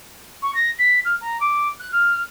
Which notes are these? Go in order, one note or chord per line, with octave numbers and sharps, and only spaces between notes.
C#6
A#6
B6
F6
A#5
D6
F#6
F6